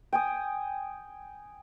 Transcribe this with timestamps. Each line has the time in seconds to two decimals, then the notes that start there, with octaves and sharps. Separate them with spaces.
0.13 G5 G#5 D#6